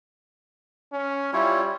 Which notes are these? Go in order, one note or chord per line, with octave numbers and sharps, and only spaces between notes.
C#4
G3 E4 F4 C#5